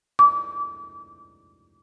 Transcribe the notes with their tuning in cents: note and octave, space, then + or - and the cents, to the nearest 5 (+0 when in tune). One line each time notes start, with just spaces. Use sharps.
D6 -35